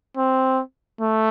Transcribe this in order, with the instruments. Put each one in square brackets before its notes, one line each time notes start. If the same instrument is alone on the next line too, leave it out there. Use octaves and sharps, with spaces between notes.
[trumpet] C4
A3